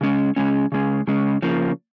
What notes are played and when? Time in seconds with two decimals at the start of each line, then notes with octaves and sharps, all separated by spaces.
0.01 C#3 G#3 C#4
0.36 C#3 G#3 C#4
0.72 C#3 G#3 C#4
1.07 C#3 G#3 C#4
1.42 C#3 F3 A#3